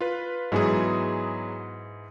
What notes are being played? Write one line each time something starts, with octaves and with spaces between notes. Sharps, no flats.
F4 B4
G#2 E3 F#3 B3 G#4